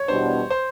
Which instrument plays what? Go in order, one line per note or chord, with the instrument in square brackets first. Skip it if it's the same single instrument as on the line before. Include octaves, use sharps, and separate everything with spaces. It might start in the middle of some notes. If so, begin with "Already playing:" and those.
Already playing: [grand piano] C#5
[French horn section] E2 B2 G3 B3 D4 [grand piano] C5
[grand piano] C5